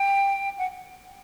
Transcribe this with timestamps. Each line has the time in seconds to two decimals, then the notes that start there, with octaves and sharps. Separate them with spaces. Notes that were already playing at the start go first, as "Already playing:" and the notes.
Already playing: G5
0.58 F#5